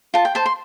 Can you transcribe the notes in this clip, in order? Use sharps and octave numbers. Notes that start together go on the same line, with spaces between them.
F4 A5
G5
C5 A5
C6